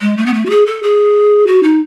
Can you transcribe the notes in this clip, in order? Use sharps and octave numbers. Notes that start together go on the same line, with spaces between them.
G#3
A3
B3
A3
F#4
G#4
A4
G#4
F#4
D#4